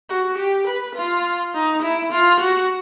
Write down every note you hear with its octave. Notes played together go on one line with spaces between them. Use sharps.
F#4
G4
B4
F4
D#4
E4
F4
F#4